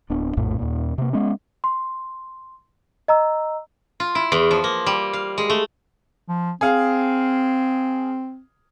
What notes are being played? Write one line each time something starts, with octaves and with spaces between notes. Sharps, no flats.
D1 B3 D4
A#1 F2 A2 A3
D#2 A#2
C3 A#3
G#3 B3 C#4
C6
D#5 A#5 E6
F4
E4
E2
F3
A#3
G3
F5
G#3
A3
F3
C4 G#4 F5